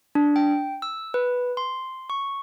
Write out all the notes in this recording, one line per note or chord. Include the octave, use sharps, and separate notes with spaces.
D4
G5
E6
B4
C6
C#6